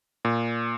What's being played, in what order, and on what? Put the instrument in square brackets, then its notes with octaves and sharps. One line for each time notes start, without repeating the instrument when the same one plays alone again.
[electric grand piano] A#2